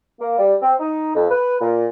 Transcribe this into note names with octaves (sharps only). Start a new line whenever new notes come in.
A#3
G3
C4
D#4
F2
B4
A#2